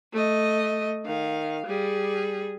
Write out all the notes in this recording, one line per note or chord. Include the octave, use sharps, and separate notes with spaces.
A3 D#5
D#3 F5
G3 G#4